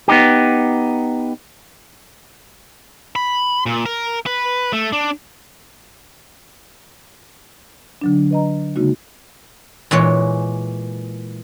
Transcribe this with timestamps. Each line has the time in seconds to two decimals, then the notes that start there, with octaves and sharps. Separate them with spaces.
0.08 B3 D#4 G4
3.16 B5
3.66 A#2
3.86 A#4
4.26 B4
4.73 A3
4.92 D4
8.01 D3 F#3 D4
8.31 B4 D#5 A#5
8.76 C#3 G#3 A#3 D#4 F#4
9.91 A#2 E3 G#3 C#5